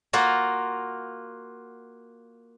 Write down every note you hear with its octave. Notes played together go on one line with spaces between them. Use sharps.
A#3 F4 F#4 A#4